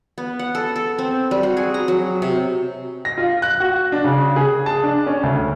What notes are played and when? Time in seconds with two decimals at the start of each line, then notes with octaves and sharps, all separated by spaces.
0.18 B3
0.39 F#5
0.55 A4
0.76 A4
0.99 C4
1.31 G3
1.43 F#4
1.57 G#4
1.74 A#5
1.88 F#3
2.22 C3
3.05 A#6
3.18 F4
3.42 F#6
3.60 F#4
3.92 D4
4.04 C#3
4.36 G#4
4.66 A5
4.84 D4
5.06 C#4
5.23 D2